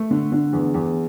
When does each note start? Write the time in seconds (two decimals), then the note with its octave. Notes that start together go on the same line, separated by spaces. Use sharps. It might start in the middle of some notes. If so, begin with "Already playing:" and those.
Already playing: A3
0.11 D3
0.32 D3
0.53 E2
0.74 E2